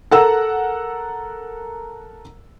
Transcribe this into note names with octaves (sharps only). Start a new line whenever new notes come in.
A4 A#4 F#5 A#5 E6